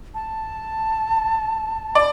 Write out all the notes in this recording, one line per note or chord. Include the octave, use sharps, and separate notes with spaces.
A5
D5